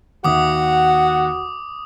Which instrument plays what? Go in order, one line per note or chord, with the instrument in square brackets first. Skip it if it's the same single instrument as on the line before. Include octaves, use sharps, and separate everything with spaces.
[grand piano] D#2 D#3 E5 [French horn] F#4 [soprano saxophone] F#5 [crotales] D6 D#6